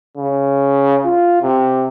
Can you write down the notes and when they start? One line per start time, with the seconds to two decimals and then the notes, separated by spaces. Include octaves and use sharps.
0.17 C#3
1.06 F4
1.42 C3